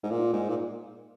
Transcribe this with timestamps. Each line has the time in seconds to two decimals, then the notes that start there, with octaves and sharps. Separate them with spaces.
0.03 G#2
0.11 A#2
0.33 G#2
0.49 A#2